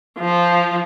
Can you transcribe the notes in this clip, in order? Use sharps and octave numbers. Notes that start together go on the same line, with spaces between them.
F3